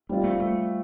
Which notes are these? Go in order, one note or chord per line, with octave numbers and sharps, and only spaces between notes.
G3 A3 C4 F4
A3
A3